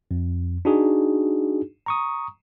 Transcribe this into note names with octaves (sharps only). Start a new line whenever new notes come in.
F2
D4 D#4 F#4 G#4
A#5 C#6 D#6